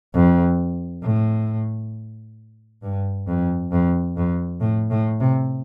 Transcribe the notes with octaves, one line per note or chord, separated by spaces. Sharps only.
F2
A2
G2
F2
F2
F2
A2
A2
C3